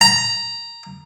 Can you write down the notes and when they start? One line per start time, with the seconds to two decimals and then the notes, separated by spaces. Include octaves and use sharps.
0.01 A#5